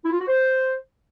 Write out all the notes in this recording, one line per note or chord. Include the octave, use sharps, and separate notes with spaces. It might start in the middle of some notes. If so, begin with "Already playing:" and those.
E4
F4
F#4
C5